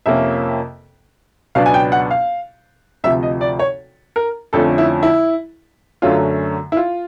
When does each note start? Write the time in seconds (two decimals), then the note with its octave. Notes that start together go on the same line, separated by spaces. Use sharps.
0.06 F2 C3 F3 A#3 C#4 E5
1.55 C#2 B2 F#3 B3 D4 F5
1.66 G#5
1.74 G5
1.92 F#5
2.11 F5
3.04 D2 C3 F3 E5
3.23 D#5
3.41 D5
3.59 C#5
4.16 A#4
4.53 F2 D3 F3 A3 C#4 A4
4.78 E4
5.03 E4
6.02 F#2 D3 F#3 A3 C#4 F4
6.72 E4
6.77 F4